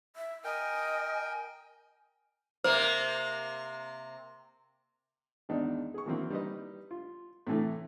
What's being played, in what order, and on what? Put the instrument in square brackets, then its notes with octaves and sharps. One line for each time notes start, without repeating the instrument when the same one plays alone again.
[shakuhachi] E5
[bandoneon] A#4 G5 [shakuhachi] D#5 [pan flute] G#5
[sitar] C3 A#3 [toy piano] C5
[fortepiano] G#1 E2 D4 D#4
G#4 C#6
D#3 E3 F#3 A#3 C4
G3 D#4 B4 D#5
F4
A2 C3 E3 A3